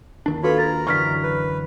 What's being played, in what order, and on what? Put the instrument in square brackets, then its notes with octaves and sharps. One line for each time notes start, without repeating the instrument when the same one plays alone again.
[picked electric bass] D#2 D#3 D4
[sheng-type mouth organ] F4 C#5 B5 [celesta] F#4 A4 B4
[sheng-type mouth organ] A#4 A#5 [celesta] A6
[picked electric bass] F#2 D3 E3 [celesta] C#6 F6 B6
[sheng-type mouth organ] B4